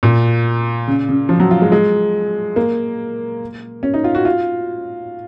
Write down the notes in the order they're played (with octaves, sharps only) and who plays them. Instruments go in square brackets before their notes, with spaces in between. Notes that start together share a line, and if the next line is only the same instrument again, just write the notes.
[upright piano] A#2
C#3
C#3
F3
F#3
F4
G#3
G#3
A#3
C#4
D#4
F4
F#4
F4